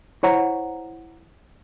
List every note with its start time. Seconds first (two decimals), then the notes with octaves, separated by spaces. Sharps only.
0.23 E4 C5 C#5 F#5 A#5